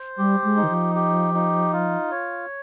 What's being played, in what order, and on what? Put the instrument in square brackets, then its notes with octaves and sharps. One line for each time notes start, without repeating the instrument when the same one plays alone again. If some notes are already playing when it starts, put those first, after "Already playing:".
Already playing: [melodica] C5
[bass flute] G3 [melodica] G4
[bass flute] G#3
[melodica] D#4
[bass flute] D#3
F3
[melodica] G4
D#4
F4
C#5